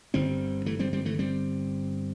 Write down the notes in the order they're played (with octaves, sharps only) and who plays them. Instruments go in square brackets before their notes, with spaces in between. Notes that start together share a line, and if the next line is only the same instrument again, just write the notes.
[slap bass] G1 G2 D3 G3 C4
E3 A3
G3 C4
G3 C4
E3 A3
G3 C4